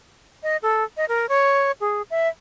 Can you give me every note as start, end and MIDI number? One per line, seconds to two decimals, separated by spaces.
0.43 0.57 75
0.62 0.84 69
0.97 1.05 75
1.09 1.28 70
1.29 1.72 73
1.81 2.02 68
2.10 2.28 76